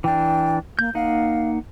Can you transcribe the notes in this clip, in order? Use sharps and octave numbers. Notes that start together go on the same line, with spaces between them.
E3 D4 G5
A#3 G6
A#3 D#4 F5 F#5